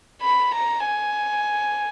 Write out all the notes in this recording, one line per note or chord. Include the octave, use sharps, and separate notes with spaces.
B5
A#5
G#5